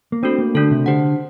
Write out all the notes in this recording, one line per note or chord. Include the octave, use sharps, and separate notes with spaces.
A#3
A3 C4 D4 F#4 A4
A#3
D3 A3 D4 F#4 A4
C3
D3 G4 C5 F#5